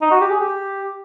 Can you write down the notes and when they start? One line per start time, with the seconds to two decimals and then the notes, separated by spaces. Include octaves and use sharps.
0.02 D#4
0.11 F#4
0.21 G4
0.31 G#4
0.40 G4